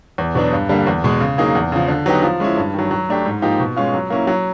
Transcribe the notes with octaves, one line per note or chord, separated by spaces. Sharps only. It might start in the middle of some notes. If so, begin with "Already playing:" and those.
E2
B2 F#3 B3 D4
G2
D3 G3 A#3
E2
B2 G#3
C#3
F#3 A#3 D#4 G#4
E2
C#3 F3
D3
F#3 B3 D#4 G4
F3
G#3 C#4 E4
G2
D#3 F#3
F#3
A3 D4 G4
G#2
F3 A#3 D#4 G4
B2
G#3 C#4 F4
F#3
A#3 C#4 E4
F#3